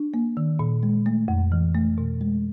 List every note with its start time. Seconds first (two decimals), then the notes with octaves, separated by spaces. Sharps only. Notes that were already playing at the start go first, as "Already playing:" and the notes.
Already playing: D4
0.14 A#3
0.37 D#3
0.59 A#2
0.83 G#3
1.06 A3
1.28 F2
1.52 E3
1.75 A3
1.98 B2
2.21 G#3